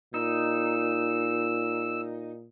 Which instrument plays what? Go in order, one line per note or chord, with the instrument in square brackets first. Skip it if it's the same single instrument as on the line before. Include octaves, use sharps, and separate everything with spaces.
[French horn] A#2 [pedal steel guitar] D#4 [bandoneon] E6